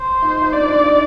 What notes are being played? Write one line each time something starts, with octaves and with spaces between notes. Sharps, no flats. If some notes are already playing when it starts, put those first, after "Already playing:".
Already playing: C5
D#4
D#4
D4 D5
D4
D#4